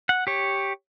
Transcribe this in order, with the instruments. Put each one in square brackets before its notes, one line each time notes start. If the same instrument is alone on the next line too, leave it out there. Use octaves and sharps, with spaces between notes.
[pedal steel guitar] F#5
G4 C#5